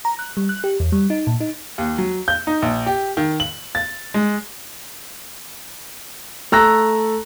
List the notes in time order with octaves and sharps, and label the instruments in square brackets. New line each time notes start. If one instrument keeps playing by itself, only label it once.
[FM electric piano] A#5
F#6
G3
F#6
G4
E2
G3
D#4
A#2
D#4
[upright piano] D#2
F#3
G6
D#4
A#1
G4
D#3
F#7
A6
G#3
[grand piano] A3 A#5 E6 F#6 A#6